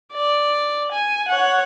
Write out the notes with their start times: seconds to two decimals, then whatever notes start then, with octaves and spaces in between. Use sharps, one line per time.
0.14 D5
0.92 G#5
1.28 C#5 F#5